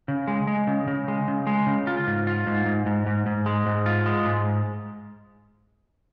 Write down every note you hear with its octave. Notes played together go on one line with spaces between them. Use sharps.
C#3
G#3
G#3
C#3
C#3
G#3
C#3
G#3
C#3
F4
G#2
F4
G#2
G#2
G#2
G#2
G#2
G#3
G#2
F4
G#3
G#2